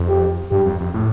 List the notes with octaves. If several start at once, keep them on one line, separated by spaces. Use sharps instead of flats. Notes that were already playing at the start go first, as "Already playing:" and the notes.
Already playing: F2
G4
G2 G4
F2
F2
A2